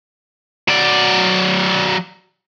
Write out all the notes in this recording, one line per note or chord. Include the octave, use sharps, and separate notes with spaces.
F#3 D5